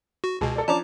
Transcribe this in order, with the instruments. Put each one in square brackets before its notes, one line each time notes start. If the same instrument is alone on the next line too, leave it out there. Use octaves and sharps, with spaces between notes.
[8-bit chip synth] F#4
[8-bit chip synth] C#2 B2 [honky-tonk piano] G#4 G#5 A5
[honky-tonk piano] A4 D5
[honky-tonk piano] F3 C#4 D4 [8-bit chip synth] A5 A#5 D6